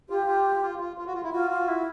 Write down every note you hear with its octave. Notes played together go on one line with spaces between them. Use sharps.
F4 G4
F4
F4
F4
F4
F#4
F4
E4
F4 F#4
F4
E4